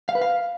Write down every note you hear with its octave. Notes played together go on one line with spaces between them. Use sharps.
F5
B4
F5